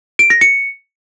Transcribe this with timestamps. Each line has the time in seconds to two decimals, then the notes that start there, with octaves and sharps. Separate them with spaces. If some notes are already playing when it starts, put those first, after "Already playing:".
0.19 D7
0.30 A#6
0.41 C#7